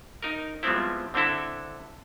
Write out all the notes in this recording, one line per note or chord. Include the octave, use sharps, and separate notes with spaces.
D#4 A#4
F3 G3 G#3 B3 C4 E4
D3 C4 D4 E4 A4